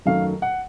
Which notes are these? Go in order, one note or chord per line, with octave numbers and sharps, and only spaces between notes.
F#2 D#3 F#3 A3 F5
F#5